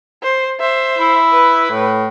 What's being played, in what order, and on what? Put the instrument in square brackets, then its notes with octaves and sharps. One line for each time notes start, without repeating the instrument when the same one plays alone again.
[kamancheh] C5
C5 E5
[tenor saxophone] E4
[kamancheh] B4
[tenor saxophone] A2